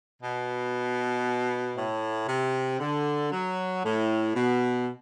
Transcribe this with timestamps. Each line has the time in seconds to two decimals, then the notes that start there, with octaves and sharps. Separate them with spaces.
0.21 B2
1.76 A2
2.28 C3
2.80 D3
3.32 F#3
3.83 A2
4.34 B2